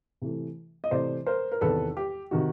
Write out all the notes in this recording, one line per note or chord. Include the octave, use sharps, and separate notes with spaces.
C3 E3 A3
D#5
C3 E3 A3 C5 D5
A#4 C5
A#4
E2 C3 D#3 A4 B4
G4
C3 D#3 F#4